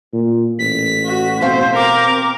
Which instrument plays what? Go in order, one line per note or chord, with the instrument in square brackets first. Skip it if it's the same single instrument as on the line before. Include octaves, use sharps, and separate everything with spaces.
[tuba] A#2
[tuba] A1 [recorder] B6
[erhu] F#4
[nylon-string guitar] B2 C4 F5 [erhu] C5
[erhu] A#4 [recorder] D6